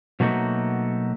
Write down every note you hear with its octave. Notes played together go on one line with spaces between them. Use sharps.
B2 F#3 A3 A#3 D#4 F#4